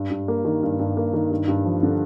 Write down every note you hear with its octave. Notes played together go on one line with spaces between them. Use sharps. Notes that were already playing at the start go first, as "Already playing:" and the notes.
Already playing: G2
G2
A#3
D#3
G2
G2
A#3
D#3
G2
G2
F3
D3